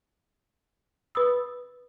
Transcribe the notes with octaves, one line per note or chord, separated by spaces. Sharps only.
B4 B5 D#6 E6